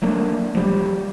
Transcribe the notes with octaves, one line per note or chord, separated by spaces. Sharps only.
F#3 A3 A#3 D4
F3 G3